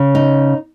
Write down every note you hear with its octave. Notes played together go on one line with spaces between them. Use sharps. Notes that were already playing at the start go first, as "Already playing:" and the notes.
Already playing: C#3
D#4